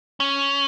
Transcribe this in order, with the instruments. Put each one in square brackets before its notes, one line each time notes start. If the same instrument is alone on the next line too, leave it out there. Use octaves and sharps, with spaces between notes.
[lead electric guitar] C#4